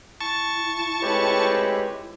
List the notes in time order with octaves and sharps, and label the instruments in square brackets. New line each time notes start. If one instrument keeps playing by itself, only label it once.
[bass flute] E4 [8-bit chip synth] A5 C#6
[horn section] G#3 A3 C4 [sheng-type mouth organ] G4 B4 C#5